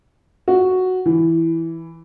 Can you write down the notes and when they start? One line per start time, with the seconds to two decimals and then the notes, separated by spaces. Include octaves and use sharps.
0.48 F#4
1.06 E3